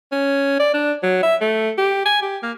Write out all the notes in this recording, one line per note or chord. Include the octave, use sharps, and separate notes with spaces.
C#4
D5
D4
F#3
E5
A3
G4
G#5
G4
A#3